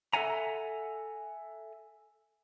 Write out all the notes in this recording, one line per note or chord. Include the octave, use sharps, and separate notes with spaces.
A4 A#4 E5 F#5 G#5 A#5